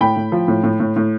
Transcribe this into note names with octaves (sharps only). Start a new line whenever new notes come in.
A2 G5 B5
A2
F3
A2
A2
A2
A2